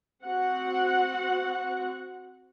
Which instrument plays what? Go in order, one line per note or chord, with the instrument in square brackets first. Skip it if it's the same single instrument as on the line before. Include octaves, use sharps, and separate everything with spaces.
[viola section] C4 F#4 F#5